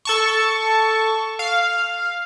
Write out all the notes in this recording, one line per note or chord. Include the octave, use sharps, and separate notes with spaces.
A4 A5 C#6
F5